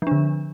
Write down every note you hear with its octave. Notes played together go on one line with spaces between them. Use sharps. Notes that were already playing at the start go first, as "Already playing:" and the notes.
D3 F3 D4